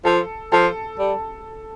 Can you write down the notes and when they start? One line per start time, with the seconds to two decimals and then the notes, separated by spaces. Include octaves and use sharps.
0.05 F3 A4
0.52 F3 A4
0.99 G3